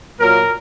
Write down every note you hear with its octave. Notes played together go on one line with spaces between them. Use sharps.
A#2 F#3 A#3 A#4